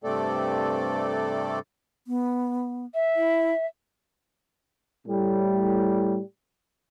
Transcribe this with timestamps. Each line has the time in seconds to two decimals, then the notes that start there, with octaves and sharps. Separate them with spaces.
0.04 G2 C3 A3 C4 A4 D5
2.07 B3
2.94 E5
3.16 E4
5.07 A2 G3